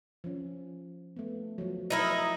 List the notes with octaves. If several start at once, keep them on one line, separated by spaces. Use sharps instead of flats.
F3 C#4
A3 B3
F3 F#3
D#4 E4 A#4 D#5